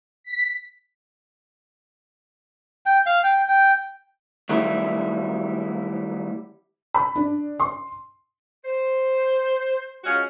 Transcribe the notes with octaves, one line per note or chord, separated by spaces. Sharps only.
B6
G5
F5
G5
G5
D#3 F#3 G3 A3 E4
B5
D4
C6
C5
G#3 C#4 F4 F#4